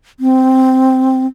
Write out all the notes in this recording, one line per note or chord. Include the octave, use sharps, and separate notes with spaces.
C4